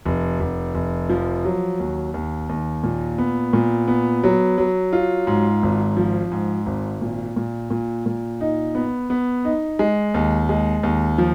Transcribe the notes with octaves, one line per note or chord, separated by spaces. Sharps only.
F1
F1
F1
F3
F#3
D#2
D#2
D#2
A#2
B3
A#2
B3
F#3
F#3
F4
G#2
G#1
F3
G#2
G#1
A#2
A#2
A#2
A#2
D#4
B3
B3
D#4
G#3
D#2
G#3
D#2
F3